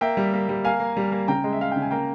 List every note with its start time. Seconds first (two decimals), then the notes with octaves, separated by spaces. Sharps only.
0.01 A#3 E5 G5
0.17 G3
0.33 A#3
0.49 G3
0.65 A#3 F5 G#5
0.80 A#3
0.97 G3
1.12 A#3
1.28 C#3 G5 A#5
1.44 G#3
1.53 E5
1.60 G#3 F5
1.71 C#3 G5
1.82 G#5
1.91 A#3 G5 A#5